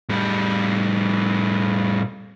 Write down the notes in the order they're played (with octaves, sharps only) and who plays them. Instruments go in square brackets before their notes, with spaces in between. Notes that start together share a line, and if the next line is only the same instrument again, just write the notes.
[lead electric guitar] A2 G3